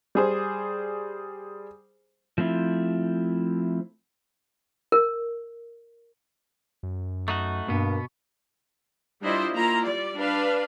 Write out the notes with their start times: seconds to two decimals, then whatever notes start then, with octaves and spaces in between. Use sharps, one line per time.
0.15 G3 G#4 C5
2.38 F3 A3 C4 E4
4.92 A#4
6.83 F#2
7.28 A3 D#4 F#4 C#6
7.68 G2 B2 A#3 B3
9.22 G3 D4 E4 F4 C5 D#5
9.54 A#3 E4 F4 A#5 C6
9.86 G3 D5
10.17 D4 B4 F5